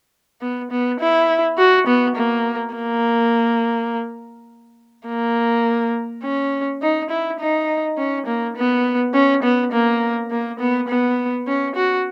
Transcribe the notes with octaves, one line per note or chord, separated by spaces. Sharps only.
B3
B3
E4
F#4
B3
A#3
A#3
A#3
C#4
D#4
E4
D#4
C#4
A#3
B3
C#4
B3
A#3
A#3
B3
B3
C#4
F#4